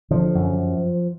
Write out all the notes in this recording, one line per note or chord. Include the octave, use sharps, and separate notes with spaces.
D3 F3
F#2